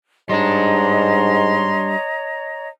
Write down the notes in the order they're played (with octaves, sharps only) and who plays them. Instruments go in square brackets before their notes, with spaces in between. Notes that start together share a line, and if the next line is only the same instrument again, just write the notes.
[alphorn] G#2 [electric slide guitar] G3 D4 [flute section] C#5 D#5 A#5 [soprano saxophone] C6